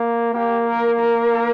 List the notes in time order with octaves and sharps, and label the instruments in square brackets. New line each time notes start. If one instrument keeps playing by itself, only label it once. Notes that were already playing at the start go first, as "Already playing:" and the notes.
Already playing: [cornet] A#3
[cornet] A#3 [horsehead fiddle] G4
[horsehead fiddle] A#4
A#4